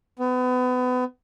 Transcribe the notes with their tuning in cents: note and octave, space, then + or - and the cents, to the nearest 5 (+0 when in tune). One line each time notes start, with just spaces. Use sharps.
B3 +30